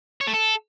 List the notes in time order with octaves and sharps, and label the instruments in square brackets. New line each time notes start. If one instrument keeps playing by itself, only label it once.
[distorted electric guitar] C#5
A3
A4